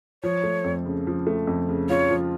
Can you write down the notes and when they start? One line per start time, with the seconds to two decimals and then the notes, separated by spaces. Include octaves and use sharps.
0.23 F3 C#5
0.44 A3
0.64 F2
0.85 C#3
1.07 F3
1.27 A3
1.47 F2
1.69 C#3
1.89 F4 C#5
2.10 F3